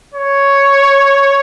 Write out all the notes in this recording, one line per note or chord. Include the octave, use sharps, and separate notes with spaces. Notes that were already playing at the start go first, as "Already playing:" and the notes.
C#5